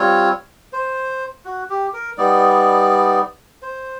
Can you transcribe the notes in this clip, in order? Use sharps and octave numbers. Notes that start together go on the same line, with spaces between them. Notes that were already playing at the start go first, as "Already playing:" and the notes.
Already playing: G3 C4 F4 C#5
C5
F#4
G4
A#4
G3 B3 D#4 D5
C5